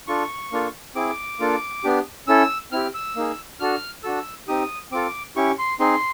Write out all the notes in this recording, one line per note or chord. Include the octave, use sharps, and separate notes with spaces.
D4 F4 A4 C#6
A#3 D4 F4 A4
C4 E4 G#4 D6
A#3 D4 F4 A4
B3 D4 G4
C#4 E4 A4 E6
C4 E4 G4 F6
E6
A#3 D#4 G#4
D4 F#4 A4 F6
D4 F#4 A4 E6
C4 D#4 G4 D#6
C4 F4 A4 D6
C#4 E4 G4 C#6
C6
C4 D#4 G#4 C6